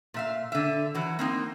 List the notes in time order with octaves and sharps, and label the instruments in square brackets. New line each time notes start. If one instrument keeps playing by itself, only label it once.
[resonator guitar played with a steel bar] A#2 E5 F5
D3 E5
E3 F#3
A#3 C4 D#4